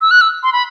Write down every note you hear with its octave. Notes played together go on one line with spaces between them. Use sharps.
E6
F#6
E6
C6
B5